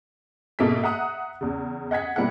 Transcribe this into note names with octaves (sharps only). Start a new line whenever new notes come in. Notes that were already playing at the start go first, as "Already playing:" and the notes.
G#2 B2 A#3 A4 E5 B6
E5 F#5 A#5 D#6 F#6
E2 C#3
D#5 F#5 G#6 B6
B2 G3 A#3 E4 E5 F#5